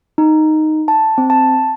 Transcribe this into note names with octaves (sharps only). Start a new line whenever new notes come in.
D#4
A5
C4
A5